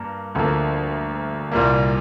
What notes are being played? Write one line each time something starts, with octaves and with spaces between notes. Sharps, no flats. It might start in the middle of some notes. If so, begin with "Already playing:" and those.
Already playing: G2 A#3
D2 D3 F3 A#3
C2 A#2 G3 A#3